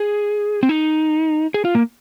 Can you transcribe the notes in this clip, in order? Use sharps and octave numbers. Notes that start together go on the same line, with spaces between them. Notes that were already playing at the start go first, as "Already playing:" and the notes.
Already playing: G#4
C4
D#4
G#4
F4
A#3